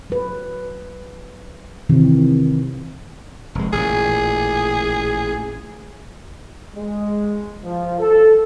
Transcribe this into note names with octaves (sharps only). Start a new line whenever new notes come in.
F#3 B4
C3 D#3 E3 C4
F1 G#3
A1 A#2 G#4
G#3
F3
A4